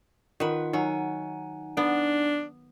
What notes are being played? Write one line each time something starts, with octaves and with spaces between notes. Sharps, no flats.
D#3 F4 B4 F#5
F#3 D#4 F#5 G#5
B3 D4